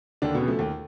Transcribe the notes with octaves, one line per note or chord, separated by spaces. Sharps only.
D#2 D3 D4
B2 B3
C#3
F3 A3
D#2